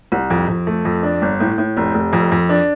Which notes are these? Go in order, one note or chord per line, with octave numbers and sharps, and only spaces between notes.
C2
F2
F2
A3
F2
D4
G1
A2
A2
F1
F1
F2
F2
D4